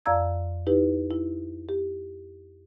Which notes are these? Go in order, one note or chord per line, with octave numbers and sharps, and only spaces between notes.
F2 D5 F5 A#5 E6 G#6
D#4 E4 G4 B4
E4
G4